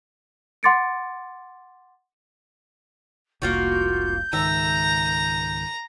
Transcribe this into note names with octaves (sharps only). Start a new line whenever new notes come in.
F#5 C6 D6 A6 C#7 D7
F1 C2 A#3 F4 F#4 G6
C#2 G#2 D#3 E5 A#5